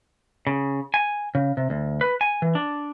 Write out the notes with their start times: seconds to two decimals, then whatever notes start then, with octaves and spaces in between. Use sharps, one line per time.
0.47 C#3
0.94 G#5
1.35 C#3
1.57 C3
1.70 D2
2.01 B4
2.21 G#5
2.42 E3
2.55 D4